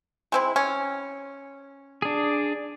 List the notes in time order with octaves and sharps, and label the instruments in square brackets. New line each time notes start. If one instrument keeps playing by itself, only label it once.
[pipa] G#3 C4 E4
C#4
[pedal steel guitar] D4 G#4